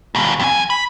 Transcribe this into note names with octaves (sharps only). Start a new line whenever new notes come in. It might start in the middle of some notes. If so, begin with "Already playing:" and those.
D#2 B2
F2 G#5
B5